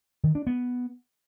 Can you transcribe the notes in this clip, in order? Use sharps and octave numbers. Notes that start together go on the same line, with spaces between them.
D#3
D4
B3